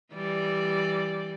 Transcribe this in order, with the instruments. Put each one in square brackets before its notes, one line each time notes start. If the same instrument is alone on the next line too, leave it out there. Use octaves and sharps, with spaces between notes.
[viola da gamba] E3 G3 D5